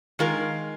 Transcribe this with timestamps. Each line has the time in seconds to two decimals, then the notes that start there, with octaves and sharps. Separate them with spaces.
0.19 D#3 G#3 F4 A#4